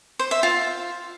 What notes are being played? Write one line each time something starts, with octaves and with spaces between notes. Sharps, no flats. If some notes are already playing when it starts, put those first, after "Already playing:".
C5
E5
F4